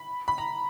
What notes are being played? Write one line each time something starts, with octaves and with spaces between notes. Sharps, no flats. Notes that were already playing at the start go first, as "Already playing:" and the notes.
Already playing: B5
B5
A#5